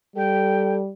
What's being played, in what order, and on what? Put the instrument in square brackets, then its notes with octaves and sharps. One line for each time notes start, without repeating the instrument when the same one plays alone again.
[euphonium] G3 [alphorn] A4 [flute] G5